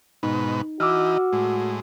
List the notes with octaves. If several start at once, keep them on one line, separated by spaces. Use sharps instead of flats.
G#2 B2 D#4 B4
E3 D#4 F#4 D6 E6 F6
A2 G#3